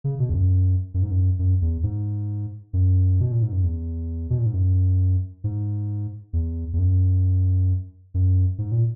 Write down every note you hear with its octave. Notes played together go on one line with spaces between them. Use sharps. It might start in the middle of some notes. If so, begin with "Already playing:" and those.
C#3
B2
E2
F#2
F#2
G#2
F#2
F#2
E2
G#2
F#2
B2
A#2
G#2
F#2
E2
B2
A#2
G#2
F#2
G#2
E2
E2
F#2
F#2
G#2
A#2